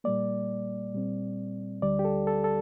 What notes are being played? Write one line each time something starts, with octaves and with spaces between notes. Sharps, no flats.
A#2 G3 A#3 D5
A#2 G3 C4
D2 D3 G3 D5
G4
A4
A4
A4